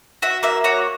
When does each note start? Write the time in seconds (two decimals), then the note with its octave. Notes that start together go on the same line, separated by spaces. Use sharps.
0.22 F#4 E5
0.43 A#3 E5
0.64 F#4 C#5